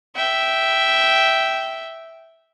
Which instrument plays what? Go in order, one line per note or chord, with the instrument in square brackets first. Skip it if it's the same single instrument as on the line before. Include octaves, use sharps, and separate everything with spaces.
[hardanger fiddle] E5 G5